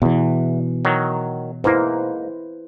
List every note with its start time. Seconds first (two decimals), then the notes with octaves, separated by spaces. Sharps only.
0.02 E2 B2 E3
0.85 D#3 F#3
1.64 G#2 A#3 E4 B4 C5